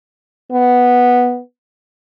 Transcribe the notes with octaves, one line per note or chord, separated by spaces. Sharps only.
B3